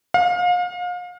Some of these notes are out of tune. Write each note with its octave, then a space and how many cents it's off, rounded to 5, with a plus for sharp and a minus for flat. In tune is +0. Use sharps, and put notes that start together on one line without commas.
F5 +35